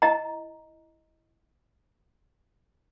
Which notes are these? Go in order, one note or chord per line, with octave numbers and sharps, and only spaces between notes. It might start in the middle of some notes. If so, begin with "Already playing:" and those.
E4 D#5 A#5